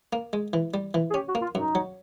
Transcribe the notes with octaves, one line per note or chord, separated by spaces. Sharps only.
A#3
G#3
E3
G3
E3
G#4
C#4 G4
F#4
A#3
F4
F#2 D#4
F#3